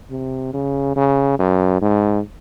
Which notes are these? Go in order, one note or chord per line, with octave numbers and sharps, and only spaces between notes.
C3
C#3
C#3
F#2
G#2